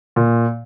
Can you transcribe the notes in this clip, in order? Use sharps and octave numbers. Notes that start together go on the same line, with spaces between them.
A#2